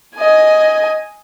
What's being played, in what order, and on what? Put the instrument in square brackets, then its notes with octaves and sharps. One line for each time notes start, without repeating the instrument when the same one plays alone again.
[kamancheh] D#5 G#5